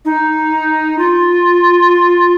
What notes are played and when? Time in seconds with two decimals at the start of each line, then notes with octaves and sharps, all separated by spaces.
0.05 D#4
0.98 F4